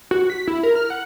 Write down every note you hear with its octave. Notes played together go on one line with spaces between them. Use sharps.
F#4
B6
E4
A#4
F6
F#5